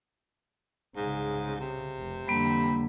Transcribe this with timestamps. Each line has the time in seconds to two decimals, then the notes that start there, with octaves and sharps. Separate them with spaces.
0.97 C2 G#2 C#3
1.60 C3
1.97 F1
2.28 F2 D3 G3 A#3 B5